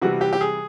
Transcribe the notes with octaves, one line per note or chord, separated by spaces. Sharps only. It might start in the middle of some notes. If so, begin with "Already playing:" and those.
C3 E3 G3 F#4
G4
G4
G#4